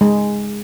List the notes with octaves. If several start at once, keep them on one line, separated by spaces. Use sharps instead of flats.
G#3